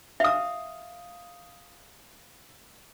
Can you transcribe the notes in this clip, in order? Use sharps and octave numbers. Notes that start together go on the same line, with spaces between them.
E5 F5 D#6